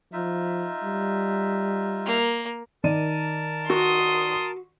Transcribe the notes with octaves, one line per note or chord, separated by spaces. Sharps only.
F3 D#4 F4 E5
G3
A#3
D#3 A#4 D5 A5 D#7
F#4 C6 D#6